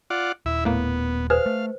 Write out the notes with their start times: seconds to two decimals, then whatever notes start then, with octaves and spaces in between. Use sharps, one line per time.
0.10 F4 D5 F#5
0.46 D#1 E4 E5
0.65 A2 A#3 B3
1.30 G#4 B4 C5 F5
1.46 A3